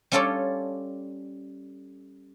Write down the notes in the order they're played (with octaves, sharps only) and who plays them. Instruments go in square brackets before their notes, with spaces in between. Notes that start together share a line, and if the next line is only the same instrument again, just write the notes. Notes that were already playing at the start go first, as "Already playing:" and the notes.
[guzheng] G3 C#4 F4 A4 C#5 D5